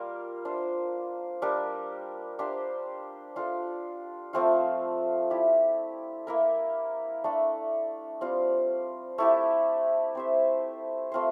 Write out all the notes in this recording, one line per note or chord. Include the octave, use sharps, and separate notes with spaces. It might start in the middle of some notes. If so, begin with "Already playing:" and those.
Already playing: G3 A#3 F4 A#4
D4 F4 C5
G3 D4 G4 A#4
D4 G4 C5 F5
D4 F4 A4
F3 A3 C4 F4
E4 G4 D5
A#3 E4 A#4
A3 D4 A4
G3 C4 F4
A3 E4 G4
C4 G4 C5 E5
A3 C4 F4 C5